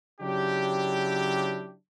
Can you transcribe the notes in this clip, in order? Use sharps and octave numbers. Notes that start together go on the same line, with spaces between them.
C#3 F#3 D4 E4 G4